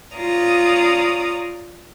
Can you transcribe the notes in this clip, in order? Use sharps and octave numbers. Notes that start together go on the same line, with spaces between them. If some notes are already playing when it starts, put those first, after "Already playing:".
F4 C#5 D5 A#5 D#6